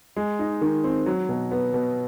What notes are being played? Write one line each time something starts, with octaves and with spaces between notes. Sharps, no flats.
G#3
D#4
D#3
C4
F#3
B2
B3
B2